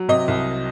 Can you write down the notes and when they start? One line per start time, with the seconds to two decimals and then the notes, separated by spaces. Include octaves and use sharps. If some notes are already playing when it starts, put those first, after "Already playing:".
Already playing: F#3
0.09 C3 D#5
0.28 C2